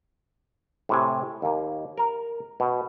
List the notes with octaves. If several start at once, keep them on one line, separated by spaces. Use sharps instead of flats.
A2 C3 G#5
D#2 A#3
A#4 A#5
B2